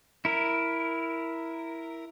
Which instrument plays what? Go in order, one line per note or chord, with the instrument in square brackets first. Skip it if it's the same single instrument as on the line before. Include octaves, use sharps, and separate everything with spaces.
[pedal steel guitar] E4 A#4